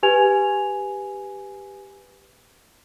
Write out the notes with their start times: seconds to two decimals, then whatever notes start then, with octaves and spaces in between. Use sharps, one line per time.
0.03 G4 B4 G#5 G#6 F7